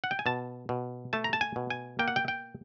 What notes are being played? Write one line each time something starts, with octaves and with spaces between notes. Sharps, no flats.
F#5
G5
G#5
B2 A5
B2
A3 A5
A#5
A5
G#5
B2
G#5
A#3 G5
F#5
G5
G5